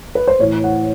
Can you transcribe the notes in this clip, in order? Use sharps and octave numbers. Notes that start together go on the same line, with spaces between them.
B4
C5
A2 E3 C#5
F#5